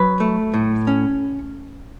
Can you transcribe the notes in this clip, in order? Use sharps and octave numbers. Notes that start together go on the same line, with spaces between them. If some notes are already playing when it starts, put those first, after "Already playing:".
Already playing: F#3 B4
A3
A2
C#4